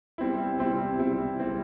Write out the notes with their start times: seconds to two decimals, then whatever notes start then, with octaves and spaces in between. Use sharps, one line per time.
0.18 G3 C4 E4
0.59 G3 C4 E4
0.99 G3 C4 E4
1.39 G3 C4 E4